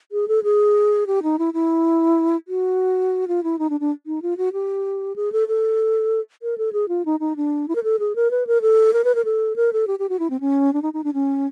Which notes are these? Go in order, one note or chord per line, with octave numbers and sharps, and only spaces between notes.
G#4
A4
G#4
G4
D#4
E4
E4
F#4
F4
E4
D#4
D4
D4
D#4
F4
F#4
G4
G#4
A4
A4
A#4
A4
G#4
F4
D#4
D#4
D4
E4
A#4
A4
G#4
A#4
B4
A#4
A4
A#4
B4
A#4
A4
A#4
A4
G4
G4
F#4
E4
C4
C#4
D4
D#4
D#4
D4
C#4